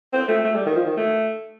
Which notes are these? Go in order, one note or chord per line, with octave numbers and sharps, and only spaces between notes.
C4
A3
A3
G3
D#3
F3
D#3
A3